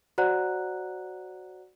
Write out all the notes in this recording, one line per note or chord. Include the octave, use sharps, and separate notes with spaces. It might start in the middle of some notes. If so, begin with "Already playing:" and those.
F#4 C5 D5 F#5 A#5 F#6